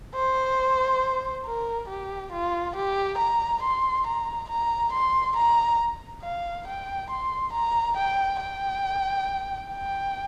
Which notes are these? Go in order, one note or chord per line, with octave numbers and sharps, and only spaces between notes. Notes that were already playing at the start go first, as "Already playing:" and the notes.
C5
A#4
G4
F4
G4
A#5
C6
A#5
A#5
C6
A#5
F5
G5
C6
A#5
G5
G5
G5